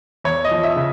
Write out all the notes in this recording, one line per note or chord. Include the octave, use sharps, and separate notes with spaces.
E2 C#5
D#5
F3
E5
C#3